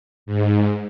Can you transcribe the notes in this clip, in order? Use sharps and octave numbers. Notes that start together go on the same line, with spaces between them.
G#2